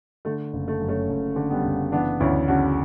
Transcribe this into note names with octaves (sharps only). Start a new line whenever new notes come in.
D3 A3
F#1
A3
F#2
A3 C#4
F#1
D3
G3 B3
F#1
E3 B3 D4
D2 C#4 E4
C#3 D4 F#4